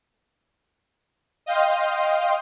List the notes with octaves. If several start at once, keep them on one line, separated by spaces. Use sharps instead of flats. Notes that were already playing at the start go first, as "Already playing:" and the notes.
D#5 F5 G5 C6